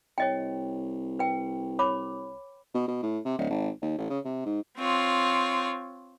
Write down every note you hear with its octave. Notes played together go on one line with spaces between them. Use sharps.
C2 C#5 D#5 G5
B4 G5
C#5 B5 D6
B2
B2
A2
C3
D1
G#1
D#2
A1
C#3
C3
G#2
C4 F4 C#5